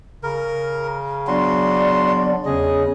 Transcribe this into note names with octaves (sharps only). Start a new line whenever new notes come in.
C#3 A#4
F#3 B3 D4 F#4 D5 C6
E2 C#3 G#4 D#5